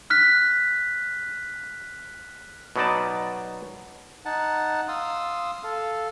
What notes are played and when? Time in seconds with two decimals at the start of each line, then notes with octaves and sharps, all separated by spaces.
0.10 F6 F#6 B6
2.76 B2 F#3 B3 D#4 D5 A5
4.25 D#4 F#5 A5
4.88 F5 C6 D#6 E6
5.64 A4 F5